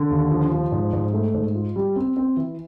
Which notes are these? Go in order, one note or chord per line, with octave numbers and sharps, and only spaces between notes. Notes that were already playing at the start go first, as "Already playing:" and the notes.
Already playing: D3
D#2
F3
F3
G#2
G#2
A3
G#2
F4
G3
C4
C4
E3